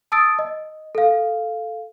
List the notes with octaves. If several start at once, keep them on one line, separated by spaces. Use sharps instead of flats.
A5 D#6 E6 A6 D7
D#5
A4 F5